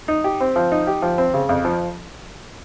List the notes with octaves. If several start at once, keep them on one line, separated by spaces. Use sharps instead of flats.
D#4
G4
C4
F3
D#4
G4
F3
C4
C#3
F2
F3